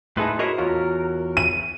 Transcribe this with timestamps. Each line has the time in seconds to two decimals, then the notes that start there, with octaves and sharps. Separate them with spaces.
0.17 A2 D#4 G#4 A4 B4 E5 C6
0.39 E4 F#4 A#4 C5 C#5 D#5
0.58 E2 F4 F#4 A#4 C#5
1.37 D#7